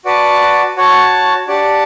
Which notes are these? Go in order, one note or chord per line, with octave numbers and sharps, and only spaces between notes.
F#4 B4 D5 F#5 A5
F#4 C#5 F#5 A5
D4 G4 D5 F#5 A5